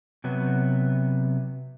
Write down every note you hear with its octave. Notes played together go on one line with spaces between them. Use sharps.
C3 F#3 B3